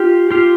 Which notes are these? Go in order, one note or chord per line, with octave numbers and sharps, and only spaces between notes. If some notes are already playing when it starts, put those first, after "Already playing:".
Already playing: F4 G4
F4 G4